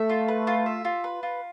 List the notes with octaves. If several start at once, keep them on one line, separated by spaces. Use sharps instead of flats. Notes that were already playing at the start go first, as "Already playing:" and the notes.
Already playing: A3 E5
F4
B4
F4
E5
F4
B4
F4